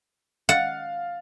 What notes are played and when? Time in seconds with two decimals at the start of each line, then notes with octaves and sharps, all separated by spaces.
0.49 F5 F#5 A6